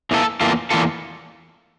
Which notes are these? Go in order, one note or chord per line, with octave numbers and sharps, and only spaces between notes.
E2 E3 A#3 F4 A4
E2 E3 A#3 F4 A4
E2 E3 A#3 F4 A4